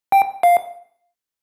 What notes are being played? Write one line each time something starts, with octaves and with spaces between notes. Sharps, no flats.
G5
F5